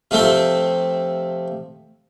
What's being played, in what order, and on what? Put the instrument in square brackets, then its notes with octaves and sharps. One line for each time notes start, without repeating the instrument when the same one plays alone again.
[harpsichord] C3 F3 A3 C4 C6